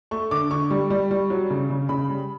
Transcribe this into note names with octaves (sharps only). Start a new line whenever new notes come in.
A3 C#6
D3 D6
D3 C#6
G3
G3
G3
F#3
C#3
C#3
C#3 B5
G3